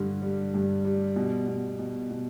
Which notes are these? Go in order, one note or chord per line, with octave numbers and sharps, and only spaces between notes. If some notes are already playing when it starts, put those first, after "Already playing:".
Already playing: G2 D3 G3
G3
G2
G3
B2
B2
B2
B2